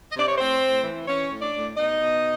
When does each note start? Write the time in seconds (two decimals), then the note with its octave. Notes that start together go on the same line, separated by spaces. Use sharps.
0.10 D#5
0.15 C3 D5
0.28 C#5
0.37 A2 C4 C5
0.61 A2
0.84 E3
1.07 E3 C#4 C#5
1.30 A2
1.42 D4 D5
1.53 A2
1.77 B2 D#4 D#5
2.00 B2